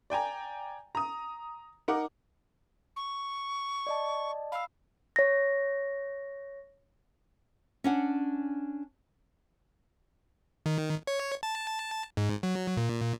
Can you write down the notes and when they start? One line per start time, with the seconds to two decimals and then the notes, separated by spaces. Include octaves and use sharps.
0.10 D5 G5 G#5 A#5
0.95 A#5 D#6
1.88 D#4 A#4 F#5 D6
2.96 C#6
3.87 D5 D#5 A5
4.52 F5 B5 E6
5.16 C#5 A#6
7.84 C#4 D4 F#5
10.66 D#3
11.07 C#5
11.43 A5
12.17 G#2
12.43 F#3
12.77 A#2